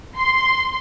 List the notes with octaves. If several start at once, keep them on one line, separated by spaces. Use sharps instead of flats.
C6